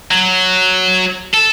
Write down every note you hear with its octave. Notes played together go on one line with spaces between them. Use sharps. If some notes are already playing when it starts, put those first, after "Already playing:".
F#3
A4